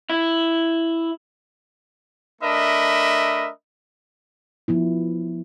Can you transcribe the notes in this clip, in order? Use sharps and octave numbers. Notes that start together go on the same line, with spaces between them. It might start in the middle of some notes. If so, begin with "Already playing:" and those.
E4
A3 D4 A#4 D#5 E5 B5
F3 B3 E4